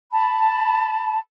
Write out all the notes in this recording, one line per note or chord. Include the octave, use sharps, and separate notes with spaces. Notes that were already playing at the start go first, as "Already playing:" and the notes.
A5 B5